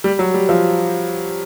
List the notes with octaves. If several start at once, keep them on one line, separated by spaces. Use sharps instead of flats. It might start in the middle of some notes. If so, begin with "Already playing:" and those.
G3
F#3
G3
F3